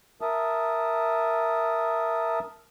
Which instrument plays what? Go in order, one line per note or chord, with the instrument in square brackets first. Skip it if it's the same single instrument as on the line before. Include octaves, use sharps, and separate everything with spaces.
[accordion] A#4 E5 A5 D#6